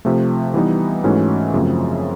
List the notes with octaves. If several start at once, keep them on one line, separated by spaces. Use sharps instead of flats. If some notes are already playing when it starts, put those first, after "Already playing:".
C3 F3 A3
E3 G3 B3 D#4
G#2 E3 A3 C#4 F#4
F#2 C#3 F3 A3 C4